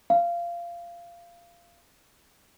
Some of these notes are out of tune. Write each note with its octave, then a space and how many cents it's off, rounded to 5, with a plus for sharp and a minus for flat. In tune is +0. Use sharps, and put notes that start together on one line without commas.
F5 -20